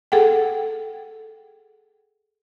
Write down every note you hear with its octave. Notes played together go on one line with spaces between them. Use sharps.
G#4 A4 F#5 G5